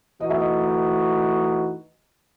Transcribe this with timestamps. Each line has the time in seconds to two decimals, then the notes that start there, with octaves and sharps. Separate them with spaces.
0.20 E3 A3 D#4 F#4 D#5
0.30 E5
0.40 D#5